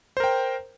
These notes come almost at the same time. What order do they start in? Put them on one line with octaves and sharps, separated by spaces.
C5 A#4 G5